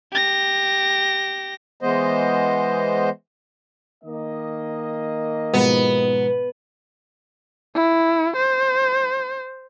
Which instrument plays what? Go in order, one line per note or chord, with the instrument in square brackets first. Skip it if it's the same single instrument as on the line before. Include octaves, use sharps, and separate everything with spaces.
[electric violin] G4 A#6
[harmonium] E3 G#3 B3 C5 D#5
[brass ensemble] D#3 A#3 D#5
[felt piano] G#2 B2 F3 [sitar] B3
[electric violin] E4
C5